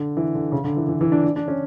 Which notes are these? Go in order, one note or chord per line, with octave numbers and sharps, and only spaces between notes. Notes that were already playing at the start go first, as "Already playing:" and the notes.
Already playing: D3
E3
D3
C#3
D3
E3
E3
E3
D4
D4
D4
C#4